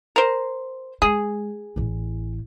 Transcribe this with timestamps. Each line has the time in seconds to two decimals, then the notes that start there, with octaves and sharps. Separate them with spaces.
0.16 A#4 C5
1.02 G#3 G#4
1.76 A1 E3